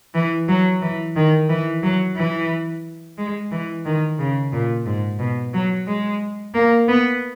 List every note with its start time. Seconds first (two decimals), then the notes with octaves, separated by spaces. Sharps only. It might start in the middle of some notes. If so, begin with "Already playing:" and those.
0.14 E3
0.49 F#3
0.82 E3
1.16 D#3
1.49 E3
1.83 F#3
2.16 E3
3.18 G#3
3.51 E3
3.85 D#3
4.19 C#3
4.52 A#2
4.86 G#2
5.20 B2
5.53 F#3
5.87 G#3
6.54 A#3
6.88 B3